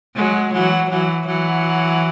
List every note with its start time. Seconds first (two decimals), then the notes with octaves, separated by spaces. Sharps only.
0.16 F#3 G#3
0.53 E3 F#3
0.90 E3 F#3
1.27 E3 F#3